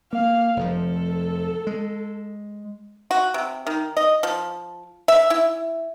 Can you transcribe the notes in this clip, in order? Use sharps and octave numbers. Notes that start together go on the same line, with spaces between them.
A#3 F5
F1 F2 F3 A4
G#3
F#4
C3
D#3
D#5
F3
E5
E4